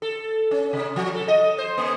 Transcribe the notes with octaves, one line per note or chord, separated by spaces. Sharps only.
A4
C#4
C3
F3
A4
D#5
C5
A#3